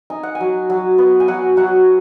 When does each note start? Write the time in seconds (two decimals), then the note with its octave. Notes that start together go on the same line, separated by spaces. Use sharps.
0.10 D#4 G#5
0.23 F#5
0.35 G#5
0.40 F#3
0.70 F#3
0.98 B3
1.20 G#5
1.28 F#3 F#5
1.57 F#3 F#5